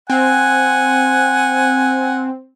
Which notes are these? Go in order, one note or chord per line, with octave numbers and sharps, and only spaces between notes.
C4 F#5 G#5